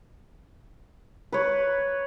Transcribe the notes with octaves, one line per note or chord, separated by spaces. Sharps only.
B4 C#5